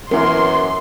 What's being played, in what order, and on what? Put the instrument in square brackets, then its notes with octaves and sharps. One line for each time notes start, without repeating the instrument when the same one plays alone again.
[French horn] F#2 [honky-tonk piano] E3 B3 [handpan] A#4 [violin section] C6